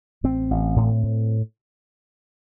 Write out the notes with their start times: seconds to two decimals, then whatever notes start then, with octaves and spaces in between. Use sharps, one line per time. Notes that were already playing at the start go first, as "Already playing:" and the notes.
0.24 A1 C4
0.51 A1
0.76 A2
1.03 A2